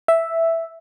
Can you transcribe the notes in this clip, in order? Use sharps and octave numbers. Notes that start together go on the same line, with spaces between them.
E5